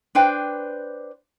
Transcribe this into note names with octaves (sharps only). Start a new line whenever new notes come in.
D4 B4 C5 G5